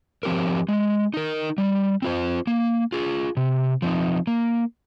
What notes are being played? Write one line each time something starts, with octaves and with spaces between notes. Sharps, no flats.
F3 C4 G4 A#4
G#3
D#4 A#4
G3
C4 F4 C5
A#3
F4 G#4
C3
F3 C4 D#4
A#3